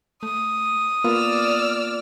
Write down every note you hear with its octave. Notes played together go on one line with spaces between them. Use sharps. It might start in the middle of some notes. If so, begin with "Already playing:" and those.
A3 D#6
A#3 B3 F4 D5 E6 F6